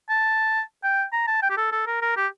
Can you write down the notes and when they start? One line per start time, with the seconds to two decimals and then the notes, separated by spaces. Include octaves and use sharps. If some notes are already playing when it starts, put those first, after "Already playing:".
0.09 A5
0.84 G5
1.13 A#5
1.27 A5
1.42 G5
1.50 G4
1.57 A4
1.72 A4
1.87 A#4
2.02 A#4
2.17 G4